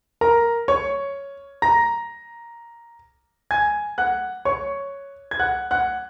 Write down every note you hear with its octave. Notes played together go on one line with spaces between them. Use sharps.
A#4 A#5
C#5 C#6
A#5 A#6
G#5 G#6
F#5 F#6
C#5 C#6
G#6
F#5 F#6
F#5 F#6